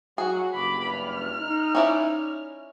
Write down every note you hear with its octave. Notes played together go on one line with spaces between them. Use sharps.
F#3 F#4 G#4
F#1 E2 G2 B5 D6
F6
D#4
C#4 E4 D5